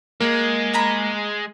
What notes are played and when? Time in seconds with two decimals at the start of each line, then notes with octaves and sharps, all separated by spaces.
0.21 G#3 A#3
0.73 G#5 A#5 B5